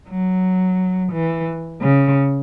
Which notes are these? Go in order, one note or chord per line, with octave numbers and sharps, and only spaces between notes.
F#3
E3
C#3